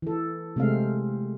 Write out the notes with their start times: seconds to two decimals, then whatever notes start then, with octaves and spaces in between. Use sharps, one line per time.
0.02 E3 A4
0.56 C3 G#3 A3 C4 F5